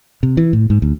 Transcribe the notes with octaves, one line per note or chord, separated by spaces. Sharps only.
C3
E3
A2
G#2
D2